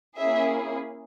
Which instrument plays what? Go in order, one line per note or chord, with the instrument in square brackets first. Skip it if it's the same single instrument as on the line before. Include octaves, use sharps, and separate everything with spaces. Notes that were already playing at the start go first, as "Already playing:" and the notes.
[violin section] A#3 C#4 E4 G#4 E5